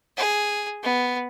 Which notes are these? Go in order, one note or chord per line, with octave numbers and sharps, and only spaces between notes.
G#4
B3